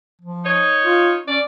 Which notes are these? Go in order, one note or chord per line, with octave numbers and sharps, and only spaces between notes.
F3
D#4 C#5
F4
C#4 D5